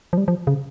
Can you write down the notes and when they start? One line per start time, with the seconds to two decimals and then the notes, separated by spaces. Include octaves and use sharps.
0.13 F3
0.17 G3
0.28 F3
0.47 C#3